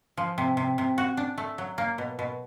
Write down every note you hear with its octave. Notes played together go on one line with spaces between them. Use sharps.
F3
C3
C3
C3
F#4
D4
A3
F#3
A#3
B2
B2